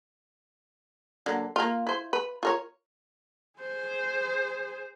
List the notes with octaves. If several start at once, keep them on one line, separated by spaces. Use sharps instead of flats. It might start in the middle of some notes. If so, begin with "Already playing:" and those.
D3 F#3 A#3
A#3 F4
E4 C5
B4
F4 A#4 C#5
G#4 C5